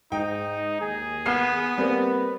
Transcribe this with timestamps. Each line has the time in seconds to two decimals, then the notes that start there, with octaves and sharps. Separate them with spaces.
0.12 G#2 D#4 G5
0.81 D#2 G#4
1.26 B3 F6 C7
1.78 G3 A#3 C4 B4